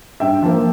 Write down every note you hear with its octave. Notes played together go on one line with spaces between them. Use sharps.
G2 E5 G5
F3 A#3